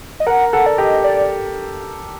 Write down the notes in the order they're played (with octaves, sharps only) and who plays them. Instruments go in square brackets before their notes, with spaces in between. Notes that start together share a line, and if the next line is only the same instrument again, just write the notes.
[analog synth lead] D#5
[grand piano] A#4 [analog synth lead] F#5
[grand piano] A4 [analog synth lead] F#5
[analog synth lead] D5
[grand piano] G4 [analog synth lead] D#5
[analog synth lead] D5